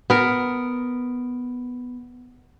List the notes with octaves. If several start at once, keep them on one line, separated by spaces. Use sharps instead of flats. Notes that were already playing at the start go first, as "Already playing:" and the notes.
B3 A#4